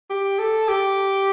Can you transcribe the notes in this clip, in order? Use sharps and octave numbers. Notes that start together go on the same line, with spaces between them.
G4
A4
G4